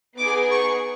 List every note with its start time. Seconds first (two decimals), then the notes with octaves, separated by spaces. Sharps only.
0.17 B3 D#4 G#4 D6
0.51 C#6